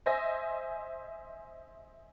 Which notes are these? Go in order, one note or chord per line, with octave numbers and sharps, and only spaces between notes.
C5 D#5 E5 G#5 A#6